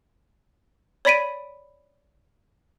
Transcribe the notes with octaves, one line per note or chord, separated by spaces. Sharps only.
C#5 D5 B5 B6 D7 D#7